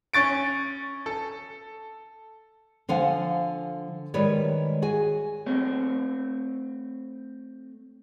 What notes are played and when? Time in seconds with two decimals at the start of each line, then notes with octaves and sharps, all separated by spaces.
0.14 C#4 C#6 A6 D7
1.06 A4
2.89 D3 F3 F5 F#5 G#5
4.14 D#3 G3 G#3 B4 C#5 D5
4.82 F#4 G#4 G#5
5.46 A3 C4 C#5